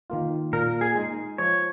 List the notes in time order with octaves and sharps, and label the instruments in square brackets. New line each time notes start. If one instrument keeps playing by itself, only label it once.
[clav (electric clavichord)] D#3 A#3 F4
[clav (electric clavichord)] A#2 [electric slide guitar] A#4
[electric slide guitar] G#4
[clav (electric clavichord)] G#3 D#4
[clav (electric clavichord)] F3 [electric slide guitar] C#5